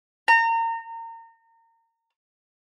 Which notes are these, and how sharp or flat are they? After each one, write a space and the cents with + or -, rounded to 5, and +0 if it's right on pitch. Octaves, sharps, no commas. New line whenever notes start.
A#5 -30